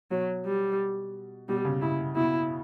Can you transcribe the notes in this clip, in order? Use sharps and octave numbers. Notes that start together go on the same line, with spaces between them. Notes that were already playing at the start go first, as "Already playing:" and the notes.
B2 F#3
G3
B2 G3
C#3
C#3 E4
B2 E4